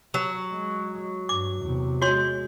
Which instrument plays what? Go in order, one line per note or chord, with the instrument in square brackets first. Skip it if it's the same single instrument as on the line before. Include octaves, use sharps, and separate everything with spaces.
[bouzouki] F#3
[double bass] G#3
[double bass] G2 [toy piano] D6
[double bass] E2 C3
[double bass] G#3 [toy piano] F#4 C#5 C6